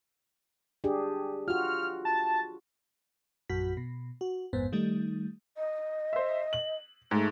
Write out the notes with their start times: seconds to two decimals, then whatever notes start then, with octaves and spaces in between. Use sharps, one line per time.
0.84 D4 G4 G#4
1.48 F4 F#4 F6
2.05 A5
3.49 A#1 F#2 F#4 B6
3.77 B2
4.21 F#4
4.53 A1 F2 G#2 B3 C5
4.72 D#3 G3 A3 D#4
5.57 D#5
6.13 C5 E5
6.53 F#7
7.11 G#2 A3